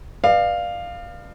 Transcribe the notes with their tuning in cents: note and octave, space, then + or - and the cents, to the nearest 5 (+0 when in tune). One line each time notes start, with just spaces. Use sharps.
B4 -10 D5 +40 F5 +0